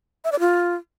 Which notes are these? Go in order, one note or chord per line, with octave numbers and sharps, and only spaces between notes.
E5
D5
F4